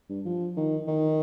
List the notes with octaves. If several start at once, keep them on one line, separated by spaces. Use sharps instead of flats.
G2
F3
D#3
D#3